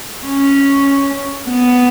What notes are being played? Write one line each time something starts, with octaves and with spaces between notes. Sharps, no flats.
C#4
B3